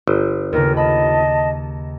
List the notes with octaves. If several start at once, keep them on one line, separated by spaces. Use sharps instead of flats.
G1 C5
D#2 C#3 A#4
D#5 A5 B5